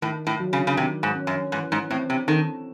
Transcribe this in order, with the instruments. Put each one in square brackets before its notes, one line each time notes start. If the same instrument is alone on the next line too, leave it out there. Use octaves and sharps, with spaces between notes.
[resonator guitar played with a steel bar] A2 [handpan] D#3
[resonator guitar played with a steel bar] A2
[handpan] F#3
[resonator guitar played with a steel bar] C#3
C#3
[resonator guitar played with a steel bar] C3 [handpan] D#3
[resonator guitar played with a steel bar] G#2
[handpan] C#4
[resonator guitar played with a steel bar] F#2
[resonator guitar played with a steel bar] G#2 [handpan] E3
[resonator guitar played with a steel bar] G#2
[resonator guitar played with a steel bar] A2 [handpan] C4
[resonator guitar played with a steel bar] C3
[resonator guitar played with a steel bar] D#3 [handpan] A4